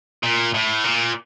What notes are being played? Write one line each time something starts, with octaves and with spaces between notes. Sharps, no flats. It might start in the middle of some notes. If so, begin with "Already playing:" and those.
A#2
A2
A#2